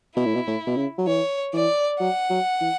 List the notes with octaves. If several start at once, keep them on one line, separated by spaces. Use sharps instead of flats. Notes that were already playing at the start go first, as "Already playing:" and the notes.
B2 E4
A2
B2
A2
B2
C#3
F#3
E3 C#5
E3 D5
F#3 F#5
F#3
E3